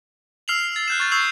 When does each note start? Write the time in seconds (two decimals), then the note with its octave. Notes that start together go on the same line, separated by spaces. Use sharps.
0.48 E6 F6 C7 F7 F#7
0.76 A6
0.88 F#6 G6 E7
1.00 C#6 G6 A6
1.12 C#6 E6 G6 G#6 C7 F#7